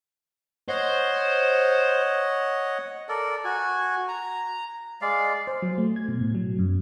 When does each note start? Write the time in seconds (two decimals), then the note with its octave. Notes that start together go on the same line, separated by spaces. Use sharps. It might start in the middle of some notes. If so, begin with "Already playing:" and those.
0.69 C5 C#5 D#5 F#5
3.09 A4 A#4 D5
3.44 F#4 G#5
4.08 A#5
5.02 G#3 D5 F5
5.47 C5
5.62 F#3
5.78 A3
5.96 G#6
6.08 B2
6.21 A2
6.35 F#3
6.59 F#2